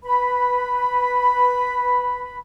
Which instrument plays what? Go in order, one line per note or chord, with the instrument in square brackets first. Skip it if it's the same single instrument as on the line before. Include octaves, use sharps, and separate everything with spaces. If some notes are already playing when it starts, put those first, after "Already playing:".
[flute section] B4 B5